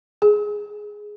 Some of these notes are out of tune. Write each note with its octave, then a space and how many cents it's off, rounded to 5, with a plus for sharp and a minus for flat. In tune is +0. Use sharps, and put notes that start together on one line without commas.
G#4 +5